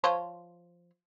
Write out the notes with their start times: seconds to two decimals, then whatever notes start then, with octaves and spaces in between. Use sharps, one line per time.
0.04 F3 C5 C#5